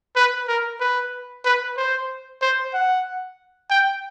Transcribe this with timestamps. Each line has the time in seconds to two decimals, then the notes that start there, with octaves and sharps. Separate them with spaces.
0.16 B4
0.48 A#4
0.80 B4
1.45 B4
1.77 C5
2.42 C5
2.74 F#5
3.70 G5